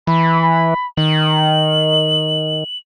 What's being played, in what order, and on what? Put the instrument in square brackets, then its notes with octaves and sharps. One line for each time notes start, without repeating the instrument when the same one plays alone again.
[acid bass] E3 [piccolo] B5
[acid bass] D#3 [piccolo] F#7